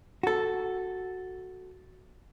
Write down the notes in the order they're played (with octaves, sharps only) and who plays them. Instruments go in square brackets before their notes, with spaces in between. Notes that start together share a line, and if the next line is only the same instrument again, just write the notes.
[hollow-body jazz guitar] F#4 A4